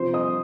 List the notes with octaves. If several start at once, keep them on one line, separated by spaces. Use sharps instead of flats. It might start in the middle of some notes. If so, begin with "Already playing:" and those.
Already playing: C3 F3 C5 C6
D#5 D#6